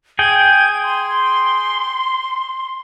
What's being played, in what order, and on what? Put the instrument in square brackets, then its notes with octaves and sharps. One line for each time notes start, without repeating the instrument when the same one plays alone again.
[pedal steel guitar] G#4 G5 [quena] G#6
[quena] C6